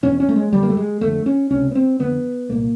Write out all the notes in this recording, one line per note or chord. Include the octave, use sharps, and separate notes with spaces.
E2 B2 C#4
C#4
A3
G#3
F#2 D3 G3
A#3
A3
G#3
F2 D3 A3
C#4
C#2 C3 C#4
B3
C4
F2 D3 B3
C2 A#2 A#3